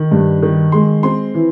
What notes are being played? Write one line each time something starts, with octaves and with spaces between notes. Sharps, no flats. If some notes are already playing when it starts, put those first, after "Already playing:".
Already playing: D#3
G2
D#3
G#3 C6
C4 C6
E3